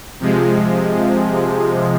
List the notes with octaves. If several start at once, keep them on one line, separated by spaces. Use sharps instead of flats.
C3 F3 G#3